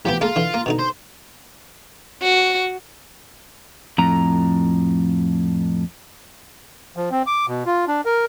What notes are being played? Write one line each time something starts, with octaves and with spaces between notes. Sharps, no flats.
A1 F3 B3 G4
G#3 A#3 F4 A4
D3 E3
A#3
B2 D3 D#4
C5
F#4
F2 A2 A#5
F3
C4
D6
B2
F4
D4
A#4